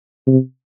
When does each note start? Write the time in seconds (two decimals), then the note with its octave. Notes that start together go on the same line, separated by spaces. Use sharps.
0.27 C3